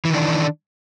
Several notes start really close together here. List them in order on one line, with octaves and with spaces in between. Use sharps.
E3 D#3 D4